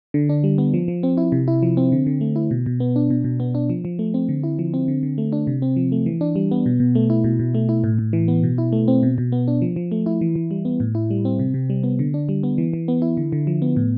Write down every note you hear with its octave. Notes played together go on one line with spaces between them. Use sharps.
D3
D4
G3
B3
F3
F3
C4
E4
C3
E4
F3
C4
D3
D3
A3
E4
B2
B2
B3
D4
B2
B2
B3
D4
F3
F3
A3
C4
D3
E4
F3
C4
D3
D3
A3
D4
C3
C4
F3
A3
E3
D4
G3
B3
B2
B2
A3
E4
B2
B2
A3
E4
A2
A2
E3
B3
B2
E4
A3
C4
B2
B2
B3
D4
F3
F3
A3
E4
E3
E3
G3
B3
A2
E4
G3
C4
C3
C3
G3
B3
D3
D4
G3
B3
E3
E3
B3
E4
D3
D3
F3
B3
A2